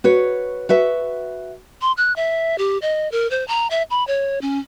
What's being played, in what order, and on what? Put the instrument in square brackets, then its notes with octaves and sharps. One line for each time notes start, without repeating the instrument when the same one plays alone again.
[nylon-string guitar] F#4 B4 C#5
F#4 B4 E5
[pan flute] C6
F#6
E5
G4
D#5
A#4
C5
A#5
E5
B5
C#5
C#4